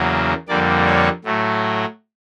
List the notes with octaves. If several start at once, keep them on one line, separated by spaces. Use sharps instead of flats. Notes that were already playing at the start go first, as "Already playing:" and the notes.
Already playing: E2 C#3 F#3 A#3
F2 D3 G3 A#3 D5
C#5
A2 F#3 A3